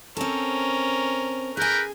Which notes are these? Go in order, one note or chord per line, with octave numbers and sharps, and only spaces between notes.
C4 C#4 A4 A#4
G#4 A#4 B4 G5 G#5